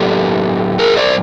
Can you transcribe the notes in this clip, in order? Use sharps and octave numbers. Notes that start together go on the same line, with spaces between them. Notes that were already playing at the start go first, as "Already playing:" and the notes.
Already playing: A2 F#3 B3 D4 G4 A4
G#4 A#4
C5 D5